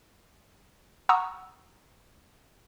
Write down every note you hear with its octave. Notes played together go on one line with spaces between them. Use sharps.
F#5 A#5 C#6 D#6 E6